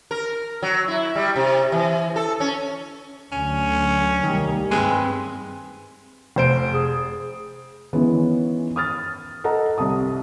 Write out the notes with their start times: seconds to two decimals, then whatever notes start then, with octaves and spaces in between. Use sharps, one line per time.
0.11 A#4
0.62 F#3
0.88 E4
1.15 G3
1.36 C3
1.72 E3
2.16 A4
2.40 C#4
3.32 D2 D3 F#3 C#4
4.24 C2 D#3 G3 A#3
4.71 G2 G#3 C4 B4 G#5
6.36 F1 C5 D7
6.72 G#4
7.93 D#3 E3 G#3 B3 C#4
8.76 D#6 F6 A6
9.44 A4 D#5 F#5 A#5
9.78 C2 C3 A5 D#6